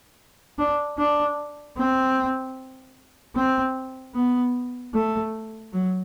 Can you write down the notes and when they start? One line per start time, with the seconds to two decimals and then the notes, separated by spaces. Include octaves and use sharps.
0.58 D4
0.98 D4
1.77 C4
3.35 C4
4.14 B3
4.94 A3
5.73 F#3